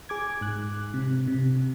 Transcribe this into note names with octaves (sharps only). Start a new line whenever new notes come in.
G#4 D6 G#6
G#2 F#6
C3
C3